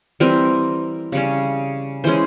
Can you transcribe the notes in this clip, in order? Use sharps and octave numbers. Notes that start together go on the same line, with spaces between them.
E3 G3 C4 A#4
C#3 G3 C#4
E3 G#3 C#4 C5